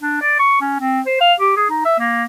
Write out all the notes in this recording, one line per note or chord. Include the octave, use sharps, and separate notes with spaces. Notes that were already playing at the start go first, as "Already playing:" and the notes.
D4
D5
C#6
C#4
C4
C5
F5
G4
G#4
D#4
E5
A#3